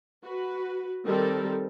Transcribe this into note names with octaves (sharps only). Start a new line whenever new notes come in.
F#4 B4
D#3 G3 C4 A4 A#4